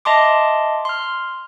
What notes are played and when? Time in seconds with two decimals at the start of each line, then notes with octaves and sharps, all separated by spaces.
0.05 D#5 E5 A5 C6 D6
0.85 C6 F6